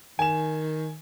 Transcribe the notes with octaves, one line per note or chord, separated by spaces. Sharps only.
D#3 G#5 E7